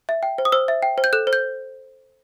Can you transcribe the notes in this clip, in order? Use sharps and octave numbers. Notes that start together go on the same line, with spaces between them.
E5
G5
C5
D#6
C5 E6
E5
G5
C5
G6
A4 F#6
C5
G6